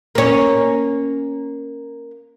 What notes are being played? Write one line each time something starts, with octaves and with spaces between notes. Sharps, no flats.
A#3 C#4